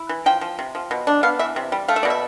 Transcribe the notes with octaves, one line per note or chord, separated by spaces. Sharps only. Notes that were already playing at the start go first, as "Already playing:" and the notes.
Already playing: E4
E3
F3 G5
F3
C3
F3
B2
D4
B3 F5
E3 E5
C3
G3
A3 F5
E5
B2 D5
E5